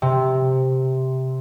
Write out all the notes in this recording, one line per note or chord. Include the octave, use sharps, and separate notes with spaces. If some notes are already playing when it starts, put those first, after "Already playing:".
C3